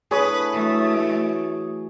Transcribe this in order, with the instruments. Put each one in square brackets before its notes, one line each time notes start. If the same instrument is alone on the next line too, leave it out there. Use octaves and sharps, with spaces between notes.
[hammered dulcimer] A2 D4 [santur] G#4 C#5 D#6 [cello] B4
[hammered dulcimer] E3 F#3 [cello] A3